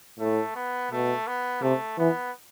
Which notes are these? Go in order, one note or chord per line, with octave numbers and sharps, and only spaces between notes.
A2 A3
B3
B2 A3
B3
C3 A3
E3 B3